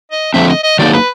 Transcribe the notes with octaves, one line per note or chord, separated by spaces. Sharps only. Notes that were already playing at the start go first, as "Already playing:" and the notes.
D#5
D3 F3 A3 C4 E5
D#5
D#5
D#3 F#3 A#3 D#4 G#4 D5
B4